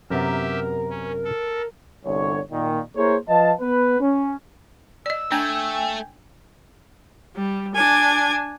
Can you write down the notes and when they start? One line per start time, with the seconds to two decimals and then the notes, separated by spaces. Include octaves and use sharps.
0.10 F#2 C3 B3 G4 A#4 E5
0.90 C#4
1.24 A4
2.05 G1 C2 D3 C#5
2.51 A#2 D#3
2.96 A#3 E4 G#4 A#4 C5 C#5
3.28 F3 B4 D#5 F5 A5
3.61 B3 B4
4.01 C#4
5.06 D5 D#5 E6
5.32 A3 D4 G5 G#5
7.36 G3
7.75 D4 G#5